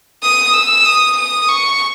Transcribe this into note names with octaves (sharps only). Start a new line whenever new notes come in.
D#6
E6
D#6
D#6
C#6